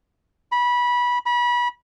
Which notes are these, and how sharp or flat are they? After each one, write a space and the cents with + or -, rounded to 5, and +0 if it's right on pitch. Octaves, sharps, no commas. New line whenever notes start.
B5 -20
B5 -30